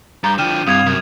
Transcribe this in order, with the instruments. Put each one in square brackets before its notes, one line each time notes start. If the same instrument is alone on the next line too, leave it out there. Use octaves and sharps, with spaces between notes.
[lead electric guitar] G2 [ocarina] A#5 [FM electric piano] G6 A6
[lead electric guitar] D3 F3 [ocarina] G5 [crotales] F6 D#7 E7
[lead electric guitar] C2 [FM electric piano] G2 C3 [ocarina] F5 [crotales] D#6 G#6 F7
[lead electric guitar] F#2